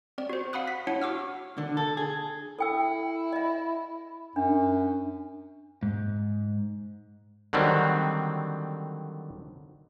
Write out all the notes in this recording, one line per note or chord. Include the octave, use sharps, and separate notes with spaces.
C4 D5
F#4 C5
F5 F#5 B5 D#6 F#6
B6
D4 E4 C#5 F#5
F#4 D6 E6 F6
D3
A4
G#4
E4 A4 G5 E6
D#5 E5
F#2 D4
G#2
D3 D#3 F#3 G3 C4